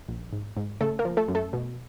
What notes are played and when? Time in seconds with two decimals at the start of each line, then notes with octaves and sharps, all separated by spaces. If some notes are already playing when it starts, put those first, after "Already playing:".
0.08 A#1
0.33 G#2
0.57 G#2
0.81 C#3 A3 A4
0.99 A#3 A#4
1.05 F3
1.17 A3 A4
1.28 F#2
1.35 A3 A4
1.53 B2